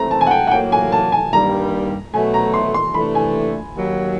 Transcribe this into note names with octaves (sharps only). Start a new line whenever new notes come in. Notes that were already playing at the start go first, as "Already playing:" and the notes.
Already playing: E3 A3 C4 A#5
A5
G#5
F#5
G5
F#5
A2 F#3 A#3 G5
G#5
A5
G#5
G2 D#3 G3 A#3 A#5
B2 F#3 A3 G#5
A#5
C6
C6
C3 E3 A3 D4 B5
G#5
D#2 D#3 F#3